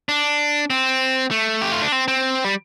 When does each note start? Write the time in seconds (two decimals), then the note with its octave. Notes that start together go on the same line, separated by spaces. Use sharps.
0.09 D4
0.70 C4
1.31 A3
1.62 G4
1.72 F4
1.82 D4
1.92 C4
2.08 C4
2.45 G3